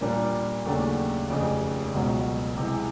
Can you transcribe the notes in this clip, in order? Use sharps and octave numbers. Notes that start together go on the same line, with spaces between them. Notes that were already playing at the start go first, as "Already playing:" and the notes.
A#2 G3 A#3 D4
D#2 C#3 F#3 A3 D4
F1 F2 C#3
C#2 B2 F#3
C3 E3 G#3